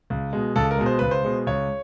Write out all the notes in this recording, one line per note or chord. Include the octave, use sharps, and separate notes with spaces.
C#2
B2 G#3
C#2 A4
A#4
B2 G#3
C5
C#2 B4
C5
B2 G#3
C#2 C#5